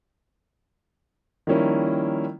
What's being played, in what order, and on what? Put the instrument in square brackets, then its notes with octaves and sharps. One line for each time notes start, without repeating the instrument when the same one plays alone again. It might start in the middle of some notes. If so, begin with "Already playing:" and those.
[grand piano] D#3 F3 G3 A#3 C#4 E4